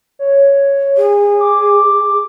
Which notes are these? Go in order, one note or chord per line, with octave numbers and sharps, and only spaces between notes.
C#5
G#4
D6